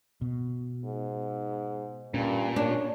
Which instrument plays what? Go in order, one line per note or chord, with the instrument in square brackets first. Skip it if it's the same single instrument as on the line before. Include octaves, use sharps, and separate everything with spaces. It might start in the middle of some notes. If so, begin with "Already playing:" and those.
[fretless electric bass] B2
[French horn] G#2
[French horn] G2 [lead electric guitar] A#2 [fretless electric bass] C#4
[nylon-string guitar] D4 [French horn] C#5